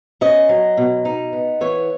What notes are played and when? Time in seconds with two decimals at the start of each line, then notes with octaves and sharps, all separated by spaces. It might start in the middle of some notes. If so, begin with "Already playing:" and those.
0.21 C#4 D#5
0.49 F#3
0.77 B2
1.05 D#4
1.33 B3
1.61 E3 C#5